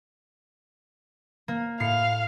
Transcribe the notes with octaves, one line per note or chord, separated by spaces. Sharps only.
A#3
A2 F5 C7 C#7